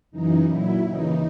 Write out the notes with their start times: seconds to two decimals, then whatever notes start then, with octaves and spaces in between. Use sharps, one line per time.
0.12 F#2 C#3 E3 D#4
0.48 A#2 F#3 E4
0.84 D#2 C#3 E3 D#4